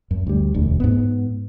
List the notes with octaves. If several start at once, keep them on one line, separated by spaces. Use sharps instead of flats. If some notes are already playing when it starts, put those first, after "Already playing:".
F#2
D2 G3
E1 D2
G#2 B3